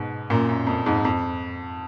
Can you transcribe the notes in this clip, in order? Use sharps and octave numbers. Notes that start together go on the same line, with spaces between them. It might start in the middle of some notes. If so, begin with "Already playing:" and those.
Already playing: G#2 B2
F#2 A#2
F#2
F2
F2 G#2
F2